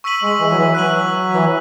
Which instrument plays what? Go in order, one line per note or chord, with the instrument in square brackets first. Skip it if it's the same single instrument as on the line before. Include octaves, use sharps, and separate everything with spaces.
[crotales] C#6 E6 B6 D#7 F#7
[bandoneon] G#3
E3
F#3
E3
[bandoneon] F#3 [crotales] F#6 B6 D#7 F#7
[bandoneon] E3